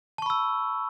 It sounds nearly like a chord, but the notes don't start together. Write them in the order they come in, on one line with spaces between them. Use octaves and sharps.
A5 C#6 B5 E6